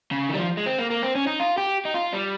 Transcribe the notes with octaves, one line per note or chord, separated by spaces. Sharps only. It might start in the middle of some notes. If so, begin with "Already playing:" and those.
C#3
D#3
G3
F3
G#3
C4
A#3
A#3
C4
C#4
D#4
F4
G4
D#4
F4
G3